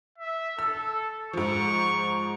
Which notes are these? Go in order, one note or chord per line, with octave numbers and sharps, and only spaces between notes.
E5
A4 E6
G#2 F3 C#6